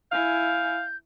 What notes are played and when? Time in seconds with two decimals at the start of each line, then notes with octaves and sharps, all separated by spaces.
0.12 E4 F5 G#5 G6